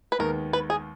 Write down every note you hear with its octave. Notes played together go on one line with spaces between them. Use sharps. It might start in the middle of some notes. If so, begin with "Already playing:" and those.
B4
D#2 D#3 G#3 B3 A#4
B4
G#4